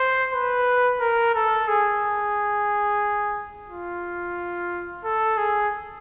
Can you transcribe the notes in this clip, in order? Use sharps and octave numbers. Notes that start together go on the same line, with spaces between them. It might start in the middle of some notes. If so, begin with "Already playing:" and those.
Already playing: C5
B4
A#4
A4
G#4
F4
A4
G#4